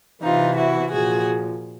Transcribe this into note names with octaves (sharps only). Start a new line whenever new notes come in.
C3 E3 D#4 F4
E4 F#4
A#2 F3 F#4 G#4